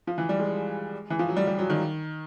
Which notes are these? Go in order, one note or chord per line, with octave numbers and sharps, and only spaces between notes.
F3
E3
G3
G#3
E3
F3
F#3
G3
G3
F#3
D#3